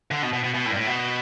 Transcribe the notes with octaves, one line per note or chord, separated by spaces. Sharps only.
D3
B2
B2
B2
B2
A2
G2
A2
B2